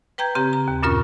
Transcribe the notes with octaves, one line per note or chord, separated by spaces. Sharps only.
B4 G5 A#5 G6 G#6
C#3 C4 G4 A#5
A#5
D#2
F#2 A#2 C#4 F4 A#4 C#6